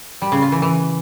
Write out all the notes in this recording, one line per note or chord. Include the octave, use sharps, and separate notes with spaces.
G3
C#3
F4
E3
E3